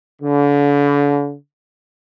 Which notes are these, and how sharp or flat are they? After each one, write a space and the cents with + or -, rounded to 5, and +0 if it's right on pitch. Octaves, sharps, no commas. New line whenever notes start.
D3 -40